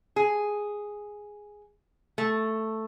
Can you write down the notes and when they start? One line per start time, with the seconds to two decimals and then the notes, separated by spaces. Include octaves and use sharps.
0.16 G#4
2.18 A3